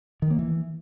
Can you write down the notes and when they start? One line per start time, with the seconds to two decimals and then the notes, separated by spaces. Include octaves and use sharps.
0.22 D#3
0.30 A#3
0.39 E3